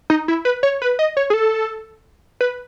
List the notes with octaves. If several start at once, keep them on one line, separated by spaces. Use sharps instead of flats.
D#4
E4
B4
C#5
B4
D#5
C#5
G#4
A4
B4